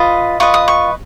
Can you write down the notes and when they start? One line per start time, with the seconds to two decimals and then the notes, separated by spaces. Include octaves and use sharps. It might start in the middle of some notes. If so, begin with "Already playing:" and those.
Already playing: F4 B4 D#5
0.40 F4 B4 D#5 C#6
0.54 D#6
0.68 C#6